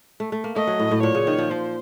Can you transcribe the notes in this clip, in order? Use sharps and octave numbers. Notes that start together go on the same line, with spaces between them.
A3
A3
A#3
A3 D#5
F#3
A2
A2
A#2 C#5
C#3
D#3
F3
F3 C5